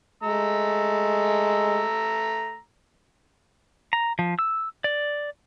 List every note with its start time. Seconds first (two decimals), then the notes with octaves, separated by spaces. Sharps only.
0.23 G#3 A3 A#5 E6
3.93 A#5
4.19 F3
4.39 E6
4.84 D5